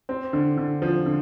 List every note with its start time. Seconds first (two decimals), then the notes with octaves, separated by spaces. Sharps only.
0.09 C4
0.33 D3
0.57 D3
0.82 F3
1.06 D3